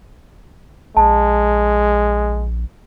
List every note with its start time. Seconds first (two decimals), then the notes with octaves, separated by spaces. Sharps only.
0.97 A#1 G#3 A5